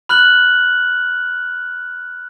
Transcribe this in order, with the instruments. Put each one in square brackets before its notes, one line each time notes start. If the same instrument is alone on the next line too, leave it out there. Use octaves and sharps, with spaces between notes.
[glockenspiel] B5 F6 F#6 F#7